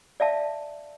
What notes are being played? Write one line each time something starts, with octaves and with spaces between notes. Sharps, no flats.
D5 E5 F5 A5